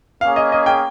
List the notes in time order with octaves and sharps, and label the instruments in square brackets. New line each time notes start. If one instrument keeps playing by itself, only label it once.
[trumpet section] A#3 C#4 G#4 [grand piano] F5
[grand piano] D#5
D#5
G5